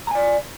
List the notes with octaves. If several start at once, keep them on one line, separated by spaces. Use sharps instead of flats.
D5 G#5 A#5